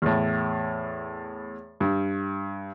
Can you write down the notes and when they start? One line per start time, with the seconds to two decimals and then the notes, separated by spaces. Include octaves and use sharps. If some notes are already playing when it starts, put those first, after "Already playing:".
0.02 E2 A2
1.80 G2